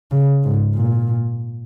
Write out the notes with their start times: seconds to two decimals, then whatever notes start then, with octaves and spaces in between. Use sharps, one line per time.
0.11 C#3
0.44 G#2
0.74 A#2